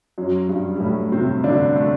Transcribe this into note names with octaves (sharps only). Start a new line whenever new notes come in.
F#2 F#3
G2 G3
G3
A2 A3
C3 C4
D3 D4
A3